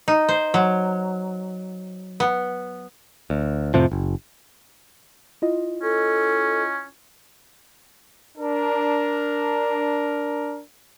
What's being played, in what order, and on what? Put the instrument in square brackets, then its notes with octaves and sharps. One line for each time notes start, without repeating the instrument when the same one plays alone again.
[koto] D#4
C5
F#3
B3
[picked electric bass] D2
F2 A2 C3 F3
F#1
[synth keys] E4 F4 D#5
[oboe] C#4 [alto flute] A4
[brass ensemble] D4 A#4